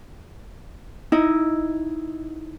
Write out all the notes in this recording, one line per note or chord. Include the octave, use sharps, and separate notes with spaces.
D#4 E4 D#5